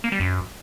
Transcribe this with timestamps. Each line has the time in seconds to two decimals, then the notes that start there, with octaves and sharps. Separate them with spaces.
0.04 A#3
0.12 G3
0.20 F#2